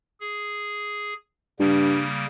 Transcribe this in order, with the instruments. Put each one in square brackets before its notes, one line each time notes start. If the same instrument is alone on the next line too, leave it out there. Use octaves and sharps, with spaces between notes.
[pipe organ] G#4
[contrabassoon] G2 [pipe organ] C#3 G3 A#3